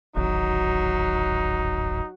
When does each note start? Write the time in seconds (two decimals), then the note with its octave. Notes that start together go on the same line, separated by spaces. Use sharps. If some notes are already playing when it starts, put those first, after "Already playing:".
0.16 D1 G#1 F#3 D#4